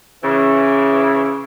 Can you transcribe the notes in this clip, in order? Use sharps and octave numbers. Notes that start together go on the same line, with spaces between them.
C#3 E3